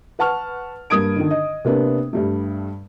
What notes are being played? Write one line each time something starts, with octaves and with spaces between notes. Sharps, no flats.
B4 F#5 A5 C#6 F6
G2 A#3 D#6 G#6 D7
D3 D#3
D#5
C3 A#3 B3 D4
G2 G3 A3